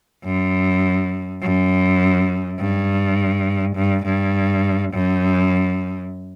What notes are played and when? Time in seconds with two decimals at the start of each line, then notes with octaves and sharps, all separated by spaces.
0.24 F#2
1.42 F#2
2.59 G2
3.76 G2
4.05 G2
4.93 F#2